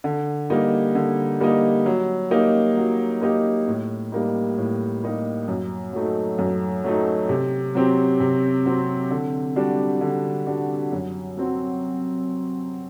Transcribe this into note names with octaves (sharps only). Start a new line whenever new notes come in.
D3
G3 A#3 D#4
D3
G3 A#3 D#4
F#3
A#3 D#4 G4
F#3
A#3 D#4 G4
A2
G3 A#3 D#4
A2
G3 A#3 D#4
F#2
F#3 A3 D#4
F#2
F#3 A3 D#4
C3
F#3 C4 G4
C3
F#3 C4 G4
D3
G3 D4 F#4
D3
G3 D4 F#4
F#2
F#3 C4 F#4